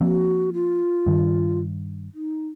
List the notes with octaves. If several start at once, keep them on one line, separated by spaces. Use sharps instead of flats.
F3 A#3 C4 F#4
F4
G2 D#3
D#4